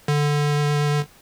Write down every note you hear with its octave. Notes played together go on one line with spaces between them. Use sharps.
D3